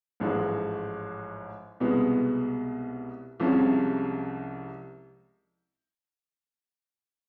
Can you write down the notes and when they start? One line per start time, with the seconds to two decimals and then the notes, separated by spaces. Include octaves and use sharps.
0.20 A1 G#2 F3 G#3
1.80 C2 B2 G#3 B3
3.40 C2 C3 F3 G#3 C#4